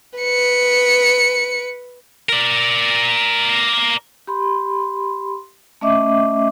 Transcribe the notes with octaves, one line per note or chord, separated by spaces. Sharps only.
B4 C#7
A#4 D5
G4 B5 C6
A3 C#4 D#5 E5 D6